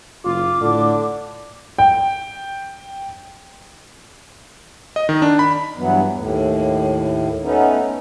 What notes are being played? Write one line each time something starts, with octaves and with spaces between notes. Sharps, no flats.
F#1 F4 D6
A2 D3
G5
D#5
D#3
D4
B5
G2 E3 F#3 B3
D#2 A2
A3 B3 C#4 D#4